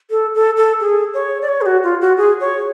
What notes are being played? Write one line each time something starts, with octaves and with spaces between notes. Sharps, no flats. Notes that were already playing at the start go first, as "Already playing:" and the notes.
A4
A4
A4
G#4
C#5
D5
C#5
G#4
F#4
F4
F#4
G#4
C#5